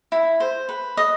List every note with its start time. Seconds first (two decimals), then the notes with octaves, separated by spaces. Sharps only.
0.12 E4
0.40 C5
0.69 B4
0.97 D#5